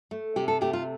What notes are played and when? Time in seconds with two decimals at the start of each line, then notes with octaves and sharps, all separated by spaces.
0.11 A3
0.36 C3 G4
0.48 A4
0.61 A3 G4
0.73 F4